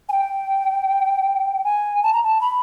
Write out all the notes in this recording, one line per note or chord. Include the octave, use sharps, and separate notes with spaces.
G#5
G5
G#5
A5
A#5
A5
B5